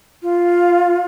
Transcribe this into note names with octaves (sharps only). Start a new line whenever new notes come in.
F4